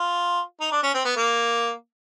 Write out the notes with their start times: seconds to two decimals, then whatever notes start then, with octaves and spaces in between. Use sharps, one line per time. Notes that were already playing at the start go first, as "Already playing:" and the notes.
Already playing: F4
0.61 D#4
0.72 D4
0.83 C#4
0.94 C4
1.05 B3
1.17 A#3